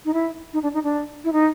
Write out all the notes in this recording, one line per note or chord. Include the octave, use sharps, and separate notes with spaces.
D#4
E4
D#4
D4
D#4
D4
E4
D#4